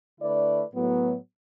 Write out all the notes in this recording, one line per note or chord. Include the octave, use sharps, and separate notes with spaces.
D3 A3 E4 B4 D5
A2 F#3 B3